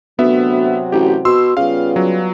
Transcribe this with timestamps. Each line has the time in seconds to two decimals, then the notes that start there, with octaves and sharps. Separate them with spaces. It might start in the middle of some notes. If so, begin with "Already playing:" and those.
0.19 D2 C3 F#3 B3 F#4 E5
0.92 A1 G4
1.25 B2 C6 E6
1.57 C#3 G3 B3 F4 F5
1.96 F#3